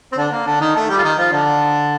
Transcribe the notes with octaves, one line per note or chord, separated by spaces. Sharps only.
C4
D3 D4
A#3
D3 D4
D#3 D#4
A3 A4
G3 G4
F4
D#3 D#4
F3 F4
D3 D4